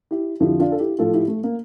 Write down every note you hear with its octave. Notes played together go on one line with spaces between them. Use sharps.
E4 G4
F2 D3 F3 E4 G4
D4 F4
A4
E4 G4
A2 F3 F4 A4
E4 G4
A3
A#3